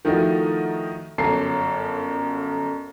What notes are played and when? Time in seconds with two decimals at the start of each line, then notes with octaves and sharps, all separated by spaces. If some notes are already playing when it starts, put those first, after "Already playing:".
0.05 D#3 F3 A3 D#4 E4 F#4
1.18 G1 F#2 C#4 A4 C7